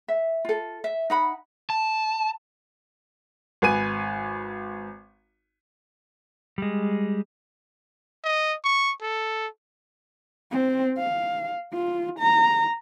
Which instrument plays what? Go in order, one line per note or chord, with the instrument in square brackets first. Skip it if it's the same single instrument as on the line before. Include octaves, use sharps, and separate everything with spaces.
[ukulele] E5
F4 A4
E5
D#4 F#5 B5
[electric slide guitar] A5
[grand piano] G#1 B4 G#5 D#7
[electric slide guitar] G3 G#3
[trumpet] D#5
C#6
A4
[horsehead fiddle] C4
F5
F4
A#5